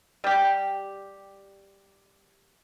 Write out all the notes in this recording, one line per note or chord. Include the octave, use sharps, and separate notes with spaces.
G3 G4